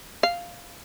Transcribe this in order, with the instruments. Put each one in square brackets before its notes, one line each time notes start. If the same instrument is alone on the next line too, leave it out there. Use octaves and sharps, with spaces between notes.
[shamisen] F5